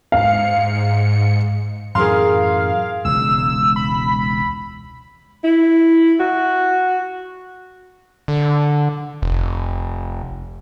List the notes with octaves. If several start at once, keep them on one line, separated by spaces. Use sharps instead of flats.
G#2 F5 C#7
F#2 A2 E3 G#4 A#4 F5 C6
E1 C#2 E6
B5
E4
F#4
D3
F1